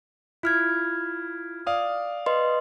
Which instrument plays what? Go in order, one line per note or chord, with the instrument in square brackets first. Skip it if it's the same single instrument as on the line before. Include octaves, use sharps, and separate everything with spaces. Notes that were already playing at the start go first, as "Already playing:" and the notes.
[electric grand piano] E4 [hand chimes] F4 F6 G#6
[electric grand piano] D5 F5 D#6
[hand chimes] B4 D#5 C6